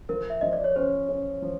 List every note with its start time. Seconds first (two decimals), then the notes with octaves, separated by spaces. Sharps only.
0.09 F3 A#4
0.30 E5
0.41 F3 D#5
0.53 D5
0.64 C#5
0.76 C#4 C5
1.09 C#4
1.42 F3